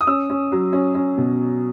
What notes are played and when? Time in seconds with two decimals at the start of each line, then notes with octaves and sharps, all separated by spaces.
0.01 D#6
0.07 C#4 E6
0.30 C#4
0.52 F#3
0.73 C#4
0.95 C#4
1.17 B2